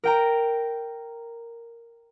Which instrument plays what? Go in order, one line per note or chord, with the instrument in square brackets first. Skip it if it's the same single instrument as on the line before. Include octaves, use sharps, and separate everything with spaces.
[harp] A#4 G5 A#5